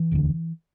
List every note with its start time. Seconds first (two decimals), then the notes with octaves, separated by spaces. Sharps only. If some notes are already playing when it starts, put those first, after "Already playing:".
Already playing: E3
0.11 E1 D2 D3